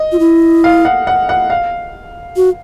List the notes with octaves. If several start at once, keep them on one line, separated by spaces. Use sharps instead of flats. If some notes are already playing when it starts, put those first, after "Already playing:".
Already playing: D#5
F4
E4
F5
F#5
F#5
F#5
F5
F#4